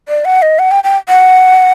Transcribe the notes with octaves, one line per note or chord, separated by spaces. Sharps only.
D5
F#5
D#5
F#5
G5
G5
F#5